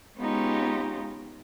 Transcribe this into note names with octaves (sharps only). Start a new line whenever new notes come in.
G#3 B3 C#4 D#4 F4 G4